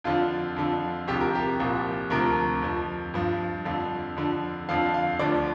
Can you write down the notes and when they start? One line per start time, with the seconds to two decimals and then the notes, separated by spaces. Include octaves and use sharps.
0.04 F2 D3 F3 F4
0.56 F2 D3 F3
1.07 C2 C3 F3 G4
1.21 A#4
1.35 G4
1.59 C2 A#2 F3
2.10 D2 C3 F3 A#4
2.62 F2 F3
3.14 G2 F3
3.65 F2 D3 F3
4.17 F2 D3 F3
4.69 F2 D3 F3 F5
4.94 F5
5.19 D2 D3 F3 D5